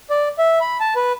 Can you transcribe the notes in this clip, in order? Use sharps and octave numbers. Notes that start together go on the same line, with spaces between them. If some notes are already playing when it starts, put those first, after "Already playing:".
D5
E5
B5
A5
B4